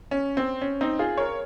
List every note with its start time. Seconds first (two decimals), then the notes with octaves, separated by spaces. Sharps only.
0.11 C#4
0.37 C4
0.61 C#4
0.81 C4 D#4
0.99 F4 G#4
1.18 A#4 C#5